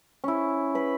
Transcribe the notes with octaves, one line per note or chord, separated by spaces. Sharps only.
C#4 E4
B4 B5